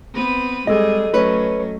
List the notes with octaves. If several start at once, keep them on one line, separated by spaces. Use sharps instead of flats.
B3 C4 B4
G3 G#3 G#4 A4 D#5
F#3 A3 C#4 B4 C#5